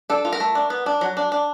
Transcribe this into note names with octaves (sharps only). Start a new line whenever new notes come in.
D4 A4
F4
A#4
A3
D4
B3
D4
F#3
D4
D4